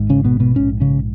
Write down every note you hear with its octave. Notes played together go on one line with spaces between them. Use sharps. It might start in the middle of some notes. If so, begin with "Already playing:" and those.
Already playing: G#1 G#2
C#3 C#4
B2 B3
B2 B3
A#1 G#2 C#4
C#3 C#4